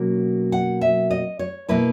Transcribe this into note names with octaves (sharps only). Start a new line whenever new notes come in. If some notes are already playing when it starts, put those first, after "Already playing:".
Already playing: B2 F#3 A#3 C#4 E4
F#5
E5
D#5
C#5
B2 A#3 E4 B4